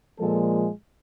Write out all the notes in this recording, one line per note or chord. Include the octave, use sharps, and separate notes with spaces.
A#2 F3 G#3 A4